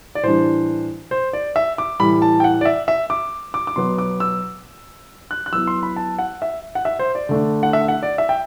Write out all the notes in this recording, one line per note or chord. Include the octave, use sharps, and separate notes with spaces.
D5
A2 E3 G3 D4 C5
C5
D5
E5
D6
A2 E3 G3 B5
A5
G5
F#5
D5
E5
E5
D6
D6
D6
B2 F#3 B3 C6
D6
E6
F#6
F#6
F#3 B3 E4 E6
C6
B5
A5
F#5
E5
F#5
E5
C5
D5
D3 A3 D4
F#5
E5
F#5
D5
E5
G5